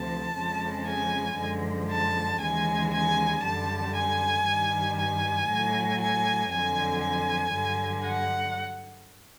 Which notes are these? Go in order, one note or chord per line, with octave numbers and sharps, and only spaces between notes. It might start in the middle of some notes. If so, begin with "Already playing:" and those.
Already playing: D2 C3 F3 A5
F2 C#3 F3 G#3
G#5
F#2 D3 F3 G#3
A5
D#2 C#3 E3 G#3 G#5
G#5
F#2 D3 G3 A5
G#5
G2 D#3 G3
G#5
A2 F#3
G#5
F2 D3 F#3 G#5
G#5
G2 D3 F#3
F#5